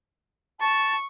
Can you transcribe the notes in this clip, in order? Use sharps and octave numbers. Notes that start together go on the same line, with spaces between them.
A5 C#6